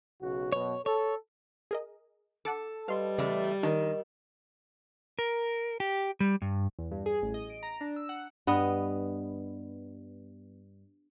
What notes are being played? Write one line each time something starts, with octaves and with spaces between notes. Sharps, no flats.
B1 C#3 F#4
F#2 B2 C#5
A4 C#5
G#4 A#4 D#5
A4 F#5 A5 D6
G3 B4 D#5 F5 C6
E2 C#3 A3 D5
D#3 D4 A#4 D#5
A#4
G4
G3
G2
E2
G2
G#4
A1
D#5
D7
A#5
D4
E6
F#5
G2 B3 D#5